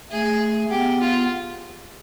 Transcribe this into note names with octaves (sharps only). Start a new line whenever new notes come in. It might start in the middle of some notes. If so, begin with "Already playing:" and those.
A3 G#4
B3 G4
F4